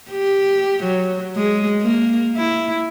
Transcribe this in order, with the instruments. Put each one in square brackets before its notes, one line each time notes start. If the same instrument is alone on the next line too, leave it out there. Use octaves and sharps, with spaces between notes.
[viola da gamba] G4
F#3
G#3
A#3
E4